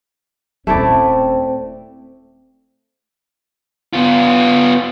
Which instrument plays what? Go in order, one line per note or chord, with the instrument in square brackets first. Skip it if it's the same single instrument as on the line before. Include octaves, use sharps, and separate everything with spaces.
[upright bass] D#1 C#4 [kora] A3 E4 D5 [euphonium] C4
[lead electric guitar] B3 F4